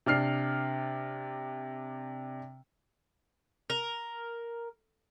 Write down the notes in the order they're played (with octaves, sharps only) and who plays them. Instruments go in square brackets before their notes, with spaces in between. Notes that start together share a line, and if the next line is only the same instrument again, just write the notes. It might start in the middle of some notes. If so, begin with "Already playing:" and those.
[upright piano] C3 D4 F6 C7
[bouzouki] A#4